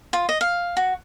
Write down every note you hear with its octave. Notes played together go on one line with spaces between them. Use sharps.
F4
D#5
F5
F#4